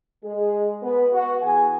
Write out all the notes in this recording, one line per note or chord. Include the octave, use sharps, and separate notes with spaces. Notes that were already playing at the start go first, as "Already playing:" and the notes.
G#3 G#4
B3 B4
F#4 F#5
E3 B3 G#4 G#5